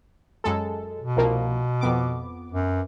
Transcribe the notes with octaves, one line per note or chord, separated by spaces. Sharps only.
F#2 G#3 A4
B2
C2 F3 A#3
F2 B3 D6
F#2